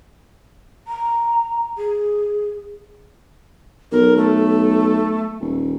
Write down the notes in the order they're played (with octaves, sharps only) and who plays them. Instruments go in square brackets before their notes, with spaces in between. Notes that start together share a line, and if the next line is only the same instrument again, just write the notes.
[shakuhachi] A#5
G#4
[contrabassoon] B1 [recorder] A#4
[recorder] A3
[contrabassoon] D#1